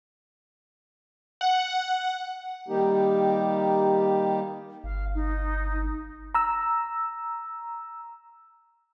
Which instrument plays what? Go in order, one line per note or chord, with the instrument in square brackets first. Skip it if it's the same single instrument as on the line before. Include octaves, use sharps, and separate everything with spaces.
[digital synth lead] F#5
[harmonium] D#3 G3 A#3 D#4 G4
[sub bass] G1 [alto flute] F5
[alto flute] D#4
[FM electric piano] A#5 E6